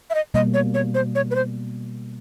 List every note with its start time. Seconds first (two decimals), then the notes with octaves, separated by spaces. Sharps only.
0.10 E5
0.15 D#5
0.34 B2 G3 A#3 D#5
0.54 C#5
0.74 C#5
0.95 C5
1.15 C#5
1.31 B4
1.35 C5